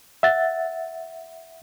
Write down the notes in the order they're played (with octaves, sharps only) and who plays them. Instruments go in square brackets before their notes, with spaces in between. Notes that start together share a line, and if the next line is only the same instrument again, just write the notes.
[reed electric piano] E5 F#5 A6